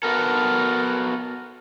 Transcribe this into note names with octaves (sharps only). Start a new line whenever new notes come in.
B3 F#4 A4 A#4